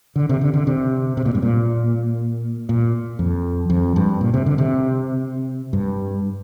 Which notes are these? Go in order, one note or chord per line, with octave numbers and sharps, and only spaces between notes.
D3
C3
D3
D3
C3
C3
A#2
G2
A#2
A#2
F2
F2
G2
A#2
C3
D3
C3
G2